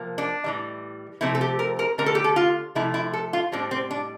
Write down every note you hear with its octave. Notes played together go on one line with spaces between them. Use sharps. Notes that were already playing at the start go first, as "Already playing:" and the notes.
Already playing: C3 F3 A#3
D4
A2 E3 G3
C3 F3 A3 C4 E4
A4
G4
A#4
A#4
D3 A3 C4 A#4
A4
G4
A4
F4
C3 F3 A3 E4
E4
A4
F4
A2 G3 C4 D4
C4
D4